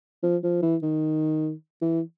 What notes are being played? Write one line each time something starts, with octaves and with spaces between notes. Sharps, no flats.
F3
F3
E3
D#3
E3